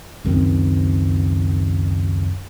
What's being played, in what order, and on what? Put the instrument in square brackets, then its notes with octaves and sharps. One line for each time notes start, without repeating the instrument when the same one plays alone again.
[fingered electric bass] C#2 F#2 D#3 C4